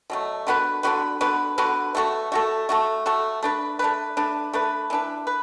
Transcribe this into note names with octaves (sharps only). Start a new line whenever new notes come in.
B2 F#3 A3
D3 B3 F#4 B4
D3 B3 F#4 B4
D3 B3 F#4 B4
D3 B3 F#4 B4
A3 F#4 A4
A3 F#4 A4
A3 F#4 A4
A3 F#4 A4
A3 D4 B4
A3 D4 B4
A3 D4 B4
A3 D4 B4
E3 D4 B4
B4